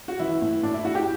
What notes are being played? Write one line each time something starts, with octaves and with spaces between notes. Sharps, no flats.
F#4
E3 E4
A2
A2 D4
E4
A2 F#4
G4